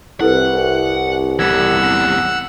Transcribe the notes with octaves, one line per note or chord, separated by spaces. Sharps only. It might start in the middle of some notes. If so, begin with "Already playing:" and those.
C2 E4 A4 B4 F#5
E2 G3 F#5 E6 G#6